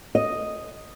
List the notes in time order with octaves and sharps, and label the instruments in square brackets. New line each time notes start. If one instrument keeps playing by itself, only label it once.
[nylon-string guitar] D#5